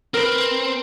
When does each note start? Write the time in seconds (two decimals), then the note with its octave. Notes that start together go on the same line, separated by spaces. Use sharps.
0.14 C4 A#4 B4